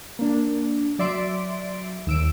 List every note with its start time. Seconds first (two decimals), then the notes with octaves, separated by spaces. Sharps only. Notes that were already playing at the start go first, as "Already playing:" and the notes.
0.19 A#3 D4
0.99 F#3 D5 E5 C6 D7
2.07 D#2 E6 D7